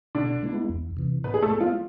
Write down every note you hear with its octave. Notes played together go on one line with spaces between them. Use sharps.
B2 D3 D4
G#3 B3 E4
E2
C3 E3
A2 B3 B4
G#4
A3 A4
G#3 B3
F3 F4